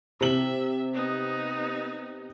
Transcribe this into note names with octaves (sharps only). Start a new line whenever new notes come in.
C3 E5 F#7
B3 D#4